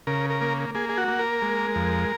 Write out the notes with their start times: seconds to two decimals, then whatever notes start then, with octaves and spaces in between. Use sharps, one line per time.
0.07 C#3 A#4
0.30 A#4
0.41 A#3
0.75 A#3 G#4
0.89 G#4
0.98 F#4
1.08 A#3
1.19 A#4
1.42 G#3
1.75 F2